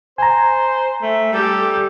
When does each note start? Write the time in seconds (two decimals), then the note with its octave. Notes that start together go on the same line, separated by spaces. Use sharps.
0.18 C5 G#5 A#5
1.02 A3
1.33 G3 G4 A4